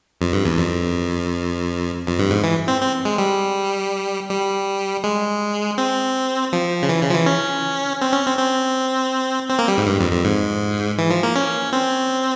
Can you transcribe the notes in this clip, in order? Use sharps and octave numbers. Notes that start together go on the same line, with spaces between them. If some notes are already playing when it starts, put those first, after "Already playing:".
F2
G2
E2
F2
F2
G2
G#2
E3
C4
C4
G#3
G3
G3
G#3
C4
F3
C#3
E3
C#3
F3
E3
C#4
C4
C#4
C4
C4
C4
A#3
G3
G#2
G2
F2
F2
G#2
E3
F3
A#3
C#4
C4